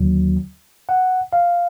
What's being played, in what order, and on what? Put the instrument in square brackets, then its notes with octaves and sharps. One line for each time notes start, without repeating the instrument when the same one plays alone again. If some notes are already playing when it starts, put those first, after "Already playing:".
Already playing: [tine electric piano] D#2 D3 F#3
F#5
F5